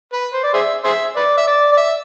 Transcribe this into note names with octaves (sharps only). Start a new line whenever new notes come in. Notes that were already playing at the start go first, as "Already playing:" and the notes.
B4
C5
D5
G#4 C5 E5
G#4 C5 E5
B4 D5
E5
D5
D5
E5